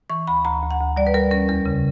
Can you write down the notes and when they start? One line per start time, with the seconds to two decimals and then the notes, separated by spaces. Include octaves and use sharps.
0.10 E3 C#6
0.27 D2 B5
0.45 D2 A#5
0.62 D2
0.71 F#5
0.80 D2
0.97 G3 D5
1.07 B4
1.14 G3 A#4
1.31 C#4 A#4
1.48 E2 A#4
1.66 C#3